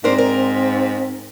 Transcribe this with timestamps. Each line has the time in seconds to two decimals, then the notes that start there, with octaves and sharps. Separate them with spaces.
0.04 G#2 C4 D4 A#4 C5
0.18 A#4